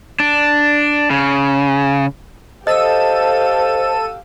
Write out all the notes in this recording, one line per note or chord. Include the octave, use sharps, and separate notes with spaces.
D4
C#3
G4 A4 C5 D#5 F5 E6 D#7